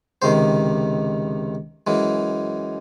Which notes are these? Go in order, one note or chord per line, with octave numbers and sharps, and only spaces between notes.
C#2 C3 D#3 C5
F#2 E3 G#3